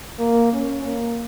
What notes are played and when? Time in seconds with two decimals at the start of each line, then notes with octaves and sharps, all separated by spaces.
0.19 A#3
0.53 C#4
0.85 A#3